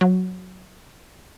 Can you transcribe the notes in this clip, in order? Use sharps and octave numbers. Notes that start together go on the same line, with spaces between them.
F#3